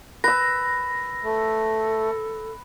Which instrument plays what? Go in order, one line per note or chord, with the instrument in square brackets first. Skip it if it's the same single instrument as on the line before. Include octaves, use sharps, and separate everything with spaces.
[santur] B4 E6 [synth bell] A#6
[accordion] A3 [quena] A4